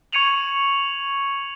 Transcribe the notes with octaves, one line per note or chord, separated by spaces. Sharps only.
C#6 G#6 C#7 D#7 F7 F#7